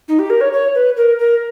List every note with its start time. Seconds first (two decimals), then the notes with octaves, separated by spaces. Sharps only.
0.08 D#4
0.19 G4
0.30 A#4
0.41 C#5
0.53 C#5
0.75 B4
0.97 A#4
1.19 A#4